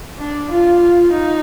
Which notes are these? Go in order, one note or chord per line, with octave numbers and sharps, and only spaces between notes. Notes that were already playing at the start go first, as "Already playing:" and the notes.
D4
F4
D#4